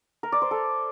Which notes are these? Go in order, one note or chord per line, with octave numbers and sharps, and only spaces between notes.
A#4
D5
C5
A4